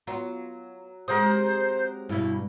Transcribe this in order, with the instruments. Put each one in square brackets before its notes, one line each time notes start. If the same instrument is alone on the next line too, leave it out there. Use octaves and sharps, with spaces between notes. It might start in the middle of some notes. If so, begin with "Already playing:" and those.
[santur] F#3 [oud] B3 F4
[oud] C3 G#3 [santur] A#4 F#5 D#6 [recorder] C5
[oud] G2 B2 [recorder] E4